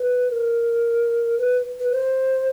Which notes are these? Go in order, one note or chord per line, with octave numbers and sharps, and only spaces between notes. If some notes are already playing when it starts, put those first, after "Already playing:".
Already playing: B4
A#4
B4
B4
C5